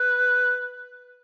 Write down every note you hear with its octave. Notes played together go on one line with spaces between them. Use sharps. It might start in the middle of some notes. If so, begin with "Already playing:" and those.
Already playing: B4